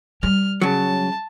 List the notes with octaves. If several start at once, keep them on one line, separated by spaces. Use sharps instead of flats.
G3 F6
C#3 F#3 A5